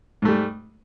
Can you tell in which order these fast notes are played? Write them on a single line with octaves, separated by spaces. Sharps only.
G#2 A3 G3